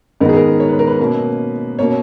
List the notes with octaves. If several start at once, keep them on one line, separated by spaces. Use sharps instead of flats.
G#2 D#3 G#3 B3 D#4 A#4
G#4
A#4
C#5
B4
A#4
B4
B2 A#3 C#4
B2 A#3 C#4 C#5